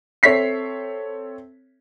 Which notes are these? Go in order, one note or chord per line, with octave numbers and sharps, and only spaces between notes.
C4 A4 C#5 E5 B6 C7